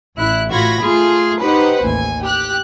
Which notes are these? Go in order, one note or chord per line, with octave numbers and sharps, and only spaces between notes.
A1 E4 F#6
A2 F4 F#4 B5 G#6 A#6
A3 F4 G#4
D#4 G4 B4 C5 F#5
A1 D#2 G#5
G4 F#6